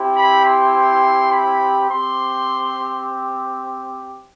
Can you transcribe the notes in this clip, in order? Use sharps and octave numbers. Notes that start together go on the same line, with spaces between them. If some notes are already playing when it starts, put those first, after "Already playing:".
Already playing: C4 E4 G4
B5
C6
B5
C4 G4 C6